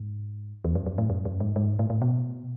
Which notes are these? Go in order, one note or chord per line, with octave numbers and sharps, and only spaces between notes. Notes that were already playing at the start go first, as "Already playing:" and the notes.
Already playing: G#2
E2
F#2
F#2
A2
F#2
F#2
G#2
G#2
A2
A2
B2